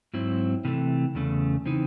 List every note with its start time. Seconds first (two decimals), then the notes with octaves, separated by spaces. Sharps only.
0.13 G#2 F#3 C4 E4
0.65 C3 E3 A3
1.15 E2 C#3 A3
1.66 C#3 E3 C4 D#4